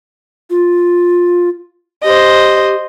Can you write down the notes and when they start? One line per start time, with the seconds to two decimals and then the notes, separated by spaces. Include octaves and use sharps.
0.50 F4
2.04 G4 C5 D#5